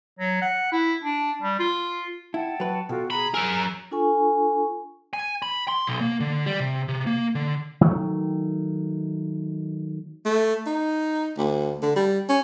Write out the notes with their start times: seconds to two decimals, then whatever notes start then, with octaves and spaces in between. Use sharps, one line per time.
0.19 F#3
0.42 F#5
0.72 E4
1.04 D4
1.42 G3
1.60 F4
2.34 E4 F#5 G5 A5
2.60 F#3 B4
2.89 B2 F4 F#4 A4 G5
3.10 G#4 A#5 B5
3.34 F#3 G#4 A#4 E6
3.91 D4 F4 A4 G#5 C#6
5.13 G#5
5.42 B5
5.68 C6
5.87 B1
6.00 A#3
6.20 D3
6.46 G3
6.60 C3
6.88 C3
7.07 A#3
7.35 D3
7.81 D#3 F#3 A3
10.25 A3
10.66 D#4
11.37 D2
11.82 D3
11.96 G3
12.29 C#4